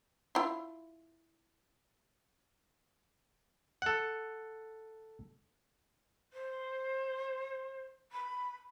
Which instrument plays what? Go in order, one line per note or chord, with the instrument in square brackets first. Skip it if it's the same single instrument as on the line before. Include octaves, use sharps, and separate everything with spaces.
[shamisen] E4 F4
[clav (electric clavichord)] A4 F#5
[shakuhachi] C5
B5